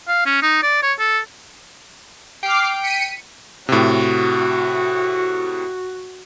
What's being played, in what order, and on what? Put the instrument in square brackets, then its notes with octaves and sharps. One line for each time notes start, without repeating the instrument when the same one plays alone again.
[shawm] F5
C#4
D#4
D5
C#5
A4
[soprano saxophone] G5 [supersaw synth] D6 F6 C7
[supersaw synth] B6 C#7 D#7
[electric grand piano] A2 C3 [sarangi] F#4